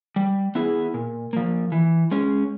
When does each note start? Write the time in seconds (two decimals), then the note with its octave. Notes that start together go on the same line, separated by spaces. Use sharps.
0.16 G3
0.55 B3 E4 G#4
0.94 A#2
1.33 F3 A#3
1.72 E3
2.11 G#3 C#4